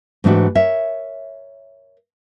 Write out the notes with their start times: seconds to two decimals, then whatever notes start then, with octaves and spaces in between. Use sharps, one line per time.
0.24 G#2 E3 A3 D4 F#4 G4
0.55 A#4 C#5 E5